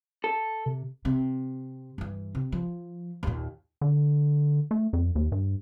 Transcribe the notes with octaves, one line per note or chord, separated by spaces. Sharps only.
A4
C3
C3
G2 E3
C3
F3
D#2 A#2
D3
A3
F2
D#2
G2